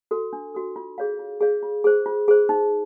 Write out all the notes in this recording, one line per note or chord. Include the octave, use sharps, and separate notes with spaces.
F#4 A4
D4
F#4 A4
F4
G#4 C#5 F5
F4
G#4 C#5 F5
F4
G#4 C5
F4
G#4 C5
D#4